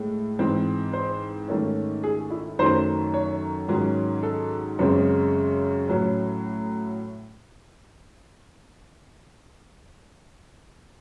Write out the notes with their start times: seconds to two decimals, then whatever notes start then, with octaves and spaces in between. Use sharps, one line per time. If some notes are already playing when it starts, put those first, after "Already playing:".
Already playing: A2 G#3
0.39 G#2 E3 C4
0.93 C5
1.48 G#2 D#3 A3 C#4
2.03 G#4
2.30 E4
2.59 F#2 D#3 F#3 A3 C5
3.14 C#5
3.68 G#2 D#3 F#3 C#4
4.23 A4
4.79 F#2 C#3 G#3 C4
5.88 A2 F#3 C#4